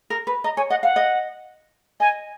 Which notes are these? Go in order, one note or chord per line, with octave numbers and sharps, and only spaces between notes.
A#4
B4
D#5 A#5
C#5 G#5
D#5 F#5
F5 F#5
D#5
D#5 G#5